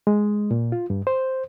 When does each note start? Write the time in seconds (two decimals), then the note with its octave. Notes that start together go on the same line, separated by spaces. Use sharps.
0.07 G#3
0.51 A#2
0.72 F4
0.90 G2
1.07 C5